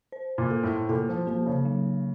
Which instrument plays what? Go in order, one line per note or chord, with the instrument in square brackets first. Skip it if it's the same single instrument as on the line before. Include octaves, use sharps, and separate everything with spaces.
[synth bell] C5
[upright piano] A#2
[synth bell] A4
[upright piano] A2
[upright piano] A#2 [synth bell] A4
[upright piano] F3
[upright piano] F3 [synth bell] A#3
[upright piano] C#3
[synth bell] F#3